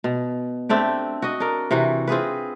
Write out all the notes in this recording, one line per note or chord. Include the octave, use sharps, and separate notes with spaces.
B2
A3 C4 D4 G4
F#4 D#5
D4 A#4
C3 E3 F#4
C4 F4 G#4 B4